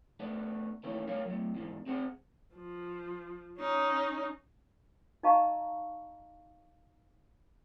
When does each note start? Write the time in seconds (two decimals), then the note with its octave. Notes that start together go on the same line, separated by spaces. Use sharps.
0.20 A3 B3 D4
0.83 D#3 E3 A3 A#3 C#4
1.08 G3 A3 A#4 C#5 F5
1.26 F#3 A3
1.55 E2 G#2 D3
1.86 C4 G#4 C5 F#5
2.55 F3
3.59 C#4 D#4
5.23 D#4 D#5 F5 A5 A#5 C#6